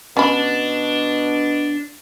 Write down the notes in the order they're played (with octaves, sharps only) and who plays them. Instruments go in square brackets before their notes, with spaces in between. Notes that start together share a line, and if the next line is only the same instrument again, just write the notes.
[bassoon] B2 [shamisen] C#4 B5 [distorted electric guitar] D4